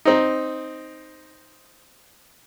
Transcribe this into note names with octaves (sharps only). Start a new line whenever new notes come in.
C4 D#4